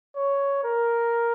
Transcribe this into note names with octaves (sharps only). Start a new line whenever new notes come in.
C#5
A#4